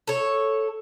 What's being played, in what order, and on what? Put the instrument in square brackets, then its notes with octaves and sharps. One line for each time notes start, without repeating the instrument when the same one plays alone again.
[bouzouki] A4 C#5